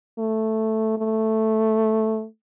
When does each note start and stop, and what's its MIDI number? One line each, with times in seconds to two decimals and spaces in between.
0.19 0.98 57
0.98 2.25 57